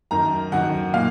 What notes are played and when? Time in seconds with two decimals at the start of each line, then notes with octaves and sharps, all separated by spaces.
0.11 F#2 D#3 A#5
0.52 F#2 D#3 F#5
0.94 A#2 F5